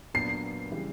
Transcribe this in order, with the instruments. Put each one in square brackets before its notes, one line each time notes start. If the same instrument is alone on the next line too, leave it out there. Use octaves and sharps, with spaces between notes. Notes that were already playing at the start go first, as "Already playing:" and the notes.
[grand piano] A#2 F#3 B3 D4 [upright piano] C7
[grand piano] C#3 E3 G3